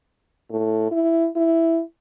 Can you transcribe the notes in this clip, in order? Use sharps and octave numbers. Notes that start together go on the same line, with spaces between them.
A2
E4
E4